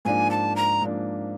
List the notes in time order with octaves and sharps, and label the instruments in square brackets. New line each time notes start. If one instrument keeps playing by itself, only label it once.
[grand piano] G#2 F3 A#3 D4 [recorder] G#5
[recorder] A5
A#5
[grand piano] G#2 F3 A#3 D4